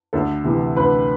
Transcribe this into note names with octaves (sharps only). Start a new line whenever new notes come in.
D2 A4
C3 E3
D2 B4